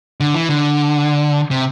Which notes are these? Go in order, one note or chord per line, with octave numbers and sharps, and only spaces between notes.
D3
E3
D3
C3